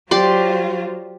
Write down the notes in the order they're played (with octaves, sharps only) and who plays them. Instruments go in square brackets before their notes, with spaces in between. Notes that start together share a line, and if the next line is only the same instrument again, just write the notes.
[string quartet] F#3 F4 C5 [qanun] G4 D5 C6